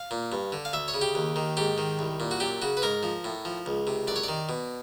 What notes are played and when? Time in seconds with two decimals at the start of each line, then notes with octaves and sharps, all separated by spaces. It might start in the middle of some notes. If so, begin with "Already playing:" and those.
Already playing: F5
0.11 A#2
0.32 G2
0.52 D3
0.65 F5
0.73 D2 E5
0.88 C#5
0.94 C#3
1.01 G4
1.15 D#2
1.36 D#3
1.57 G#2 G4
1.78 D#3
1.99 C2
2.20 A#2
2.31 F#4
2.40 F#2 G4
2.62 C#3 F#4
2.77 B4
2.82 G#2 A#4
3.03 F3
3.24 A2
3.45 F3
3.66 C#2
3.87 C3
4.07 F#2 D5
4.16 C#5
4.23 D#3 D5
4.49 B2